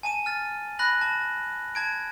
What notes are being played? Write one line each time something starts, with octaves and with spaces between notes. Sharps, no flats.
G#5 A5 D#7
F6 A6
B5 F#6 A#6 F#7
A5
A5 G#6 D7